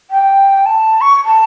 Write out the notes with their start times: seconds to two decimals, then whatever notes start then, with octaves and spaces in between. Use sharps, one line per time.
0.11 G5
0.66 A5
1.01 C#6
1.25 A5